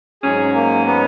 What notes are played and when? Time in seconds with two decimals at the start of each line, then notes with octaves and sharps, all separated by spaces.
0.22 G#2 F#3 C#4 G#4
0.54 A#3
0.86 B3